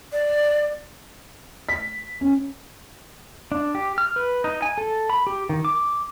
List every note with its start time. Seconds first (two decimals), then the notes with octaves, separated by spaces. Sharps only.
0.13 D5
1.69 B6
2.21 C#4
3.52 D4
3.75 G4
3.98 F6
4.16 B4
4.44 D#4
4.62 G#5
4.78 A4
5.10 B5
5.27 G4
5.49 D#3
5.65 D6